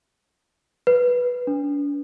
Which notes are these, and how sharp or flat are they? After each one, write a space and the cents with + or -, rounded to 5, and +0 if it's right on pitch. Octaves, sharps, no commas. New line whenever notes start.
B4 -10
D4 -40